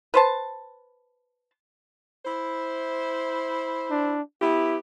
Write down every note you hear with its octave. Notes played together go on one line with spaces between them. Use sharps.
B4 C5 A5
E4 C5
D4
B3 E4 G4